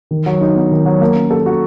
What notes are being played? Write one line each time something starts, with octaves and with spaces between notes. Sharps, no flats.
D#3
F#3
D#4
B3
D#3
F#3
A#3
C#4
A4
F#4